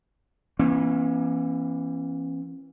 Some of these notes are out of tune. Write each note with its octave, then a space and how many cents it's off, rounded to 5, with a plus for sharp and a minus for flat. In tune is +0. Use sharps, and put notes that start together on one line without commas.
E3 +15 A#3 +45 C#4 -40